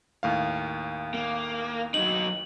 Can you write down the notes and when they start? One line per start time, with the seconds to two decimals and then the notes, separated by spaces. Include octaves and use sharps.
0.23 D#2 A2 F5
1.14 A#3
1.94 F#3 D#4 F#7